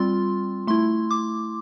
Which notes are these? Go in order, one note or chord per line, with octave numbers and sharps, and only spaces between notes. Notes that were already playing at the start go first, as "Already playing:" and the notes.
Already playing: G3 C4 F4 C6
A3 E4 C6
D6